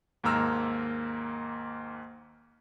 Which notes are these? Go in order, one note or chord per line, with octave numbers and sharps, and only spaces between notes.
D#2 G#2 A#3 A#5 E6 F6